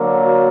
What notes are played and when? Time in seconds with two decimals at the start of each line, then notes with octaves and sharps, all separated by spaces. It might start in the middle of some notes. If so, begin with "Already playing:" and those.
Already playing: D3 F#3 A#3
0.20 F#4